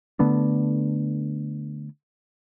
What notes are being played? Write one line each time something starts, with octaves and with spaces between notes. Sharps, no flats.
D3 A3 B3 D4